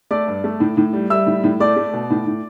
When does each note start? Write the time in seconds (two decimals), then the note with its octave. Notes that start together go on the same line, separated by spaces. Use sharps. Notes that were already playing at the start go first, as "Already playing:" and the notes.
0.11 A3 D5 D6
0.27 G2
0.44 A3
0.60 A2
0.77 A2
0.93 G3
1.10 G3 E5 E6
1.27 A2
1.44 A2
1.60 A3 D5 D6
1.76 A3
1.93 B2
2.10 A2
2.27 A2